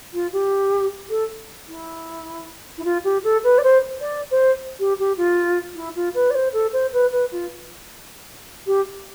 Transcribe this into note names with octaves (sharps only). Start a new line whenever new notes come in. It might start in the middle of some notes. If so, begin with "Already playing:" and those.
F4
G4
A4
E4
E4
F4
G4
A4
B4
D5
C5
D5
C5
G4
G4
F4
E4
F4
B4
D5
C5
A4
C5
B4
B4
F4
G4